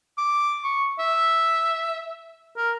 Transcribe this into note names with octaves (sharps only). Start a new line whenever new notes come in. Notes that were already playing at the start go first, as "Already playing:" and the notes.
D6
C#6
E5
A#4